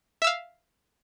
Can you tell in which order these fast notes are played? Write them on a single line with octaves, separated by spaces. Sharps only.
E5 E6 F5